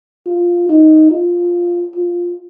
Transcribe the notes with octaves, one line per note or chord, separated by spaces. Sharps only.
F4
D#4
F4
F4